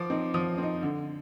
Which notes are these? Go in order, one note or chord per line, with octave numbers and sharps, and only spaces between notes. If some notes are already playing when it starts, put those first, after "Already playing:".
Already playing: F3 D6
C4 D#4
F3 D#6
C4 D#4
D3